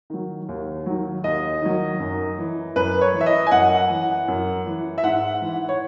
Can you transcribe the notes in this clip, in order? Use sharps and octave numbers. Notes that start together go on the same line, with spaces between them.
D#3 F#3
D#2
D#3 F#3
D#2 D#5
D#3 F#3
F#2
E3
F#2 B4
C#5
E3
E5
D#5
G#5
F#2 F#5
E3
F#2
E3
E5
G#2 F#5
E3
C#5